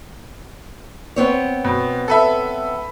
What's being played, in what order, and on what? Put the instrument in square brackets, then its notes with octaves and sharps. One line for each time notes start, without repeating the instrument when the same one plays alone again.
[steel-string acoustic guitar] B3 C4 C#5
[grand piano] B2
A4 B4 E5